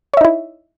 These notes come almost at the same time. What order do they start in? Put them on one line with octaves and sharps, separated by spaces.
C#5 E5 D#4 E4